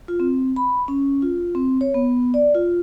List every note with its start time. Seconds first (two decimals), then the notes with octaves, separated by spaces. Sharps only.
0.08 F4
0.20 C4
0.56 B5
0.88 C#4
1.22 F4
1.55 C4
1.81 C#5
1.94 B3
2.34 D5
2.55 F4